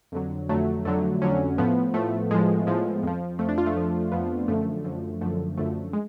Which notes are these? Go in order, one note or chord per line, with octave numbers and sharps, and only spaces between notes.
F2 D3 F#3
F2 D3 F#3 A3
F2 D3 F#3 A3
F2 D3 F#3 C#4
A2 F3 B3
A2 F3 A3
A2 F3 G#3
A2 F3 G#3
F2 F3
F2 F3 A3
D4
F4
A3
F2 F3
F2 F3 B3
F#2 D3 F3 A3
F#2 D3 F3
F#2 D3 F3 A3
F#2 D3 F3 A3
G#3